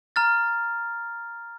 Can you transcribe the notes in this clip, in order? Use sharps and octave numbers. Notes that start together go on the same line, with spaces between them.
A#5 F6 A6